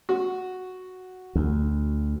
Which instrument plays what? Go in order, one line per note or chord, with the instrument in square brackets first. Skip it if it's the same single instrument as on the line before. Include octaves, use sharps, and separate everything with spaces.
[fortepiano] F#4
[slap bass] D2